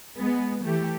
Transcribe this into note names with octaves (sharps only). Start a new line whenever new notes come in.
G#3 B3
E3 A3 G4